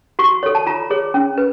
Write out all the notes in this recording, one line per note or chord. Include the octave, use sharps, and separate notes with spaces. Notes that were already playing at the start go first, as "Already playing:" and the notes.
F#4 C#6
A4 C#5
A5
F4 A#5
G#4 C#5
C#4
B4